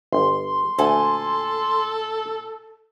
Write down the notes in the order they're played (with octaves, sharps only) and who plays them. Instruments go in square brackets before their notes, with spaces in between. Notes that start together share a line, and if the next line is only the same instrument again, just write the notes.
[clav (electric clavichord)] G1 [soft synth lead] C6
[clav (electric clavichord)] D2 [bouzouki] A#2 G#5 [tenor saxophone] A4